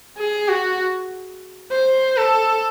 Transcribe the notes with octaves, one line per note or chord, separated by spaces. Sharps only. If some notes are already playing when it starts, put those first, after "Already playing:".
G#4
F#4
C5
A4